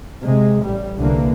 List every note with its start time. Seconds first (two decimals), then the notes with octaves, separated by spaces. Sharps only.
0.23 C3 G#3
0.65 A1 G3
0.97 C2 D3 E3 A#3